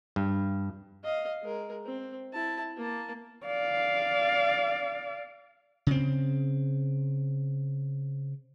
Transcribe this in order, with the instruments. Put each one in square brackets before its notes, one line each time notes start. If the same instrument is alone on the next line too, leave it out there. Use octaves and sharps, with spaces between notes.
[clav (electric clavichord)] G2
[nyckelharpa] D#5 F5
G#3 A#4
C4
E4 A5
A#3 A5
[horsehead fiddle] D5 F5
[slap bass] C#3 C4